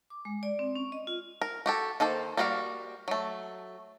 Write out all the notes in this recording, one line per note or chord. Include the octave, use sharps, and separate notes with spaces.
D6
G#3
D5
C4
C#4
D#5
F4
A#4
F#4 G4 A4
D#3 A#3 A4 C5
G3 A#3 F#4 D5 F5
F#3 A3